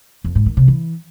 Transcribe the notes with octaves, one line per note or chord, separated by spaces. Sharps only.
F2
G#2
D#3
C3
E3